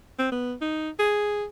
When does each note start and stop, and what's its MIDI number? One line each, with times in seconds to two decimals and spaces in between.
0.19 0.28 60
0.32 0.54 59
0.61 0.90 63
0.99 1.45 68